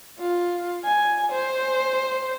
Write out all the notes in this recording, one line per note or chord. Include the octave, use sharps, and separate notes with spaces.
F4
G#5
C5